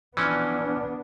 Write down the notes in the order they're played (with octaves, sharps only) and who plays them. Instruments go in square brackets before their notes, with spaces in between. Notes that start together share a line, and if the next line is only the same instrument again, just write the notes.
[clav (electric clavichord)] E3 F3 C#4 [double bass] B3 D4